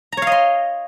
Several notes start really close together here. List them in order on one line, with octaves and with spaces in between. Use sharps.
A#5 C#5 F5 D#5 C6